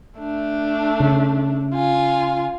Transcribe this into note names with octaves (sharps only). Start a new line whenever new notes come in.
A3 D4
C#3
F4 G#5